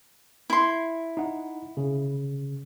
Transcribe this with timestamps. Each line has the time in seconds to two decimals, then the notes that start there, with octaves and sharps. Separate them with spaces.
0.50 E4 C6
1.17 D#4 F#5
1.77 C#3